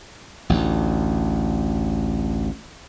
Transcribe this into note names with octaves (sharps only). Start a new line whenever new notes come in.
A1 D2